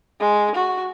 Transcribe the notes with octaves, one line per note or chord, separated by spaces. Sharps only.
G#3
F#4